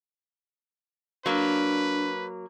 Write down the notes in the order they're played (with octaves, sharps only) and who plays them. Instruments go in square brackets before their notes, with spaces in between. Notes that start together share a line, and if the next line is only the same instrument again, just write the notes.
[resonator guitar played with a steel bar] F#3 A#3 [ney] D4 [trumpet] B4